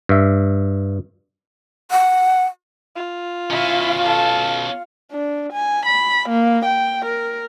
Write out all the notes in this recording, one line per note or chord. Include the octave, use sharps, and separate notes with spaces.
G2 E5
F#5
F4
B2 C#4 E4 F5
A4
D4
G#5
B5
A#3
G5
A#4